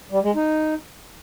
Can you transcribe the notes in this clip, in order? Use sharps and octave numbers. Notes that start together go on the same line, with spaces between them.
G3
G#3
D#4